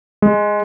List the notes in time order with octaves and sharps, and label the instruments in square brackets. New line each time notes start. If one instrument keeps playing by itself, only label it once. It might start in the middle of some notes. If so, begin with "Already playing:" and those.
[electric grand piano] G#3